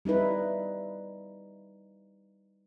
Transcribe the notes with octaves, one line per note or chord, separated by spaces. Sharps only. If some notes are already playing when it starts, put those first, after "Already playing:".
G3 D#4 E4 B4